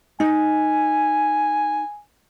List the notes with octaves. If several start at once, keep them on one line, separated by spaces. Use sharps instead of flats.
D#4 G#5